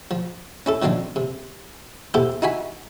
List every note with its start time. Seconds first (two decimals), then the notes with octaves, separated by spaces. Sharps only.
0.11 F3
0.66 C#4 E4 A4
0.82 D#3 F3 F#3 C4 D4
1.16 C3
2.14 B3 E4 G4 A4 C5
2.42 D#4 E4 F#4 G#5 B5